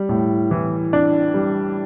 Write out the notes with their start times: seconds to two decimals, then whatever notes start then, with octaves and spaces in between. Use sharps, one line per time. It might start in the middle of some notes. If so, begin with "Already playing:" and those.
Already playing: G3
0.09 A2
0.51 E3
0.93 D4
1.34 G3